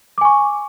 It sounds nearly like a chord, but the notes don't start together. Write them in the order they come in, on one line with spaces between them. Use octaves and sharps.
D6 G#5 C#6